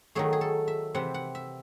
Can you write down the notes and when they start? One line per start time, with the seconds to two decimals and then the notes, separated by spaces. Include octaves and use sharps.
0.15 D#3 F#3 A3 G#4
0.33 G#4
0.41 A4
0.68 E5
0.95 C3 E3 C4 F#5
1.14 F#5
1.35 E5